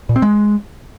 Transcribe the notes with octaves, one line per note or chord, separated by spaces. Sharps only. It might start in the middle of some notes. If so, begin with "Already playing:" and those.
A#2
C4
G#3